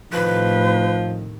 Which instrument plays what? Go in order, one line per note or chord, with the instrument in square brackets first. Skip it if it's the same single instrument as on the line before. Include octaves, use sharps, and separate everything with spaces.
[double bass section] A2 C3 D#3 [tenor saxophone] F3 [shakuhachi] B4